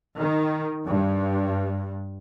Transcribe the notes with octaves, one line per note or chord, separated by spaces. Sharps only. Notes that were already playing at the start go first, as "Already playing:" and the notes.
D#3
G2